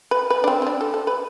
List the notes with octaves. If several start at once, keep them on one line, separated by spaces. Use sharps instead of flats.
B4
B4
D4
C4
C4
D4
A4
A4
B4